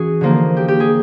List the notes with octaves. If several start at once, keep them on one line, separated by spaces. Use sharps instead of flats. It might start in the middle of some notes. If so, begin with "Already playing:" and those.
Already playing: E3 C#4 F#4 G#4
D3 F3 A#3 D#4
G4
G4
G#4